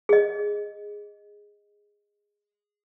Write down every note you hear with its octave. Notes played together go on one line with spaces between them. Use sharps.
G#4 D#5